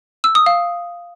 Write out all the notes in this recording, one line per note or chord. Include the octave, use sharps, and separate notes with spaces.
E6
D#6
F5